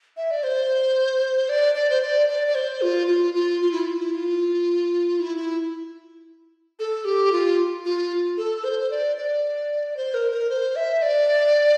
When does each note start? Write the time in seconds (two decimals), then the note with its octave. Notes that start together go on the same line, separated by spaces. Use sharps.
0.17 E5
0.31 D5
0.43 C5
1.49 D5
1.75 D5
1.90 C5
2.02 D5
2.29 D5
2.48 D5
2.55 C5
2.82 F4
3.07 F4
3.34 F4
3.62 F4
3.72 E4
3.79 F4
3.96 E4
4.14 F4
5.20 E4
5.37 E4
6.79 A4
7.05 G4
7.32 F4
7.85 F4
8.37 A4
8.64 C5
8.80 C5
8.91 D5
9.17 D5
9.97 C5
10.14 A#4
10.32 A#4
10.50 C5
10.76 E5
11.02 D5